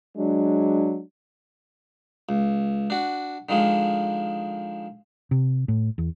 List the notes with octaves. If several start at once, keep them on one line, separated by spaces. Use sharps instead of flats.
F#3 G#3 D4
C#2
D4 F#4
D3 D#3 F3 G#3
C3
A2
E2